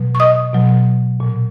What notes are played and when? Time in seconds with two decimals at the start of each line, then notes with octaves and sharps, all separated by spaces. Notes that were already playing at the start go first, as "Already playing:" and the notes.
Already playing: B2 F#3
0.15 C#6
0.20 D#5 D#6
0.54 B2 F#3
1.20 A#2 F#3